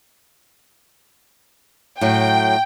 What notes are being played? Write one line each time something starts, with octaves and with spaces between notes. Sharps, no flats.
A2 F#3 G5